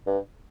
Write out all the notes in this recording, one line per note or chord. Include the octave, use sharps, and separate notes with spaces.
G2